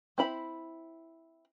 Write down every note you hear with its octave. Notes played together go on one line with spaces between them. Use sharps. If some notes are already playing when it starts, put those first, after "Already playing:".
C4 E4 B5